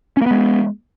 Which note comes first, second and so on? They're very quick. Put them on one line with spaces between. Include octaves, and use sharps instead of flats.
C#4 A#3 B3 G#3